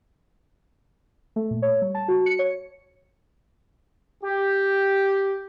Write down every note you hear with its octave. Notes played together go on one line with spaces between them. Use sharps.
A3
A#2
C#5
G3
A5
F#4
C#7
C#5
G4